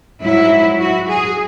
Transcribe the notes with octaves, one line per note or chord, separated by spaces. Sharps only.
G#2 F#3 E4
F#4
G#4